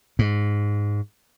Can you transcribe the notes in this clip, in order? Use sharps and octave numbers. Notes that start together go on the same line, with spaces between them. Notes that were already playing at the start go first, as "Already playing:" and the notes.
G#2